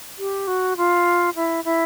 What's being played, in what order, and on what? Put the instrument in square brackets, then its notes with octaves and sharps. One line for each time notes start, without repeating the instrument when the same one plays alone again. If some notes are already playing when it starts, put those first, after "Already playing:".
[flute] G4
F#4
F4
E4
E4